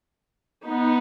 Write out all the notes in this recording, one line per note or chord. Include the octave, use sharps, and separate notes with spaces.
B3 D#4